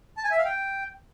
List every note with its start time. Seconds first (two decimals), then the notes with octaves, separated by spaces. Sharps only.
0.17 A5
0.24 G#5
0.31 E5
0.38 F5
0.45 G5